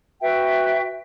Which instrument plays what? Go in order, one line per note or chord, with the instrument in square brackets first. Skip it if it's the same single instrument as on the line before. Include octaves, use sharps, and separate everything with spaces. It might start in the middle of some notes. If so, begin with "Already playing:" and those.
[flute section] F#4 B4 E5 G5